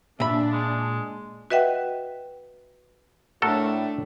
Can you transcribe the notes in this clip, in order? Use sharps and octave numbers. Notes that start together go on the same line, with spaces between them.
A#2 D4 E5 B5
G#3
F#4 B4 D#5 E5 F#5 G5
A2 A3 D4 F#4 A4 A#4